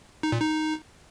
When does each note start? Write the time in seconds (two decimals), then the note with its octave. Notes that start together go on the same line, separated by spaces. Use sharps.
0.23 D#4
0.32 A#2
0.41 D#4